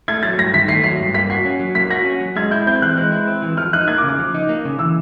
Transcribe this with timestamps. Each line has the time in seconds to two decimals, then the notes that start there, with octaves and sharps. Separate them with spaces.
0.08 A3 G#6
0.23 F#3 A6
0.38 G2 A#6
0.54 D#3 B6
0.68 A3 C7
0.84 F#3 C7
1.00 G2
1.14 A#3 B6
1.30 F#4 C7
1.45 C#4
1.60 F#3
1.75 A#3 B6
1.90 F#4 A#6
2.05 C#4
2.20 F#3
2.36 G#3 G#6
2.51 E4 G6
2.67 C4 G6
2.82 E3 F#6
2.97 G#3
3.12 E4
3.28 C4
3.42 E3
3.57 F3 F6
3.73 D#4 F#6
3.88 A#3 G#6
3.98 D6
4.03 C#3
4.08 D6
4.19 F3
4.34 D#4
4.49 A#3
4.65 C#3
4.79 E3 E6